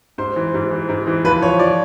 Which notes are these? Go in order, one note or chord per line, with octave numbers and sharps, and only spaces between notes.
G#2 C5
E3
G#2
E3
G#2
E3
F3 B4
F3 C#5
F3 D5